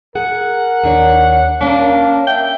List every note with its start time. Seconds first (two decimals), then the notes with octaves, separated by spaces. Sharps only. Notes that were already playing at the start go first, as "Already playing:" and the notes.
0.15 G#4 A#4 F#5
0.83 D#2 D4 C#5
1.61 A#3 C#4 D4 A#4 F5
2.27 E5 G5